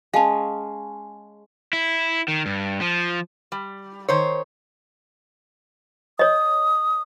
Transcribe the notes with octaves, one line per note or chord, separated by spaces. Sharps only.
G#3 C#4 F5 A5
E4
D#3
G2
F3
G3
D#3 C5 C#5
C#5 D#5 D#6